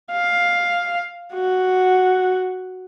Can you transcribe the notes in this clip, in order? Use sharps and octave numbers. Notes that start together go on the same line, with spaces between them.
F5
F#4